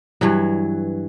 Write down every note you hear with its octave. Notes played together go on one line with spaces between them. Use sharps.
G2 E3 F#3